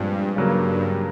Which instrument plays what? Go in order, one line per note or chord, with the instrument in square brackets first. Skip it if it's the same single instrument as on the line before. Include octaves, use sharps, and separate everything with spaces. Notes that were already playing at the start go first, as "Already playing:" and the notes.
Already playing: [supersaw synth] G2 [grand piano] A#2 F3 G#3 C4
[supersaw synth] G2 [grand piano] C#3 F#3 A#3